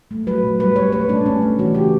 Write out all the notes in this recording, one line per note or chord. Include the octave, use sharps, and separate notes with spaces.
A3
F#3 B4
B2
G3 B4
G3 C#5
A3 B4
A3 D4
A3 C#4
A3
E3 F#4
C#3 G4